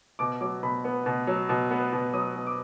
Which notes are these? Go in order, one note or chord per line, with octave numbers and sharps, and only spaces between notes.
B2 D6
F#3 D6
B2 B5
B3
B2
F#3
B2
B3
B2
F#3 D#6
B2
D6